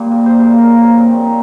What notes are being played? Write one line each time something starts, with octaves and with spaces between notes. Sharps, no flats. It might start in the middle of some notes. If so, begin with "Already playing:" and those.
Already playing: A#2 G3 A#3 C5
A#4
C5
C#3 F3 A#3 A#4
A#4
C5
A#4
A#2 G3 A#3 C4
C#4
D#4